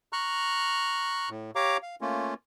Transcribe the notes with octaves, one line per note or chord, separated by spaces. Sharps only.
A#5 C#6 F6 F#6
A2
G4 C#5 F5 A#5 D6
F5
A3 A#3 C#4 F4